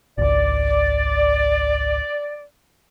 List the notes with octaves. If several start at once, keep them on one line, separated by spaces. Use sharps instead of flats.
G#1 C#2 D5